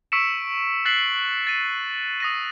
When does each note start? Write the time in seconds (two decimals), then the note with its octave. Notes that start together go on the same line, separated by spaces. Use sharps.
0.12 C#6 E6 B6 C#7 D7 E7
0.85 F#6 A6 B6 C7 F#7
1.47 A6 D#7
2.20 D#6 A#6 D#7